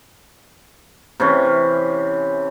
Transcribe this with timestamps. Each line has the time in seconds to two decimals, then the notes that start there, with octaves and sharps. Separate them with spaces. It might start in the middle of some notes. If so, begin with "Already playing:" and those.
1.20 C3 E3 C#4